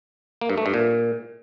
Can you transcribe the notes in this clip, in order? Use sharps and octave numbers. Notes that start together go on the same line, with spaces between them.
A#3
G2
A3
G2
A#2